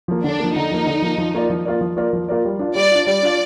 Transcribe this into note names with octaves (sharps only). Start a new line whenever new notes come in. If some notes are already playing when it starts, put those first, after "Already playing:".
F3 A#3
D3 D4
F3 A#3
D3 D#4
F3 A#3
D3
F3 A#3
F3
A#3 F4 A#4 D5
F3
A#3 F4 A#4 D5
F3
A#3 F4 A#4 D5
F3
A#3 F4 A#4 D5
G3
D4 F4
G3 D5
D4 F4
G3 D5
D4 F4